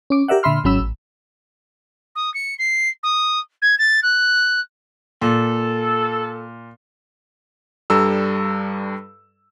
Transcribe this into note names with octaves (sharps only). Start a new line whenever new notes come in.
C#4 D6
G4 A#4 D5 E5 F#5
A#2 D3 E5 B5 C6 F6
G#1 G#2 F#3 C#4 B5 E6
A1
D#6
C#7
C7
D#6
G#6
A6
F#6
A#2 A4
G2 G3 A4 A#5 E6